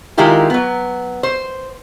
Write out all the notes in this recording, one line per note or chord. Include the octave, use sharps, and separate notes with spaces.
D#3 G#3 E4 F4 G4 A#4
F#3 B3
C5